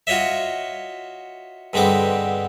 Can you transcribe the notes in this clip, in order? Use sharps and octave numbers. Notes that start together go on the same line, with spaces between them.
F4 F#4 C#5 D#5 E5
G2 D3 G#3 B3 C4 D6